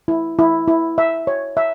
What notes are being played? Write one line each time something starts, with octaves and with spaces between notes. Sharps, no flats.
E4
E4
E4
E5
C#5
E5